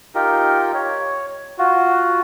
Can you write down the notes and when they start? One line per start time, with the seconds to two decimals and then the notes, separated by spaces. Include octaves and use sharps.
0.15 D#4 F4 G4 A#4
0.74 C#5
1.58 F4 F#4